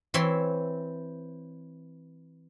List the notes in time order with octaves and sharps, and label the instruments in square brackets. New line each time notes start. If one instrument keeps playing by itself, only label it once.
[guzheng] E3 C4 C#5 E5 C6